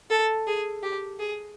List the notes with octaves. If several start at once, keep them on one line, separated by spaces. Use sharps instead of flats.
A4
G#4
G4
G#4